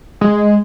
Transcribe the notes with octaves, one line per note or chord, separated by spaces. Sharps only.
G#3